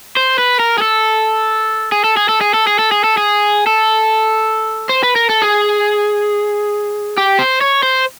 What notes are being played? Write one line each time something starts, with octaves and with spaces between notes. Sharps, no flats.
C5
B4
A#4
G#4
A4
G#4
A4
G#4
A4
G#4
A4
G#4
A4
G#4
A4
G#4
A4
C5
B4
A#4
A4
G#4
G4
C5
C#5
C5